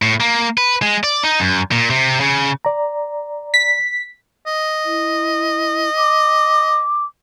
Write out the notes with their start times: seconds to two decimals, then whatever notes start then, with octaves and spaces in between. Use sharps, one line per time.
0.02 A2
0.20 A#3
0.58 B4
0.82 G#3
1.04 D5
1.23 D#4
1.40 F#2
1.71 A#2
1.90 C3
2.20 C#3
2.65 D5 A#5
3.54 B6
4.47 D#5
4.85 E4
5.96 D6